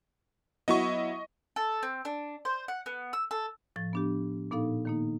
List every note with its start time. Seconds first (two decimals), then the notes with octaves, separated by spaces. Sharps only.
0.68 F#3 B3 E4 D#5 C#6
1.56 A4
1.83 C4
2.05 D4
2.45 C5
2.68 F#5
2.86 B3
3.13 E6
3.31 A4
3.76 A2 F3 A6
3.93 B3 D4 G4
4.51 A#2 B3 D#4 A4 F5
4.85 D#3 A#3 D#4